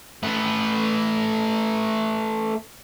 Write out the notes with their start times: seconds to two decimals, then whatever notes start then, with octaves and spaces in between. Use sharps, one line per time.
0.23 A3 B4